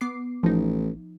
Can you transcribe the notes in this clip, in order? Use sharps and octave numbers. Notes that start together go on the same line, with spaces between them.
B3 D6 C7
A1 F3 D#4